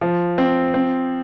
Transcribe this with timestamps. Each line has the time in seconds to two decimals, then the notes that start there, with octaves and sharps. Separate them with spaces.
0.01 F3
0.38 C4
0.74 C4